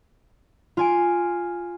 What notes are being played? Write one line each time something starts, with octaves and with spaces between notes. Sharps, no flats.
F4 G#5 D7